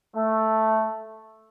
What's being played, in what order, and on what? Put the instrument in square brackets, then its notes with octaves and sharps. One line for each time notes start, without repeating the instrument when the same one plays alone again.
[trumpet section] A3